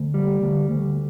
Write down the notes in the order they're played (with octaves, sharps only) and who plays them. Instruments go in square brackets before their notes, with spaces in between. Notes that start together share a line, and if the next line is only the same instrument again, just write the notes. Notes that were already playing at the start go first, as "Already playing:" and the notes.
Already playing: [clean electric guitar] D2
G3
D2
D2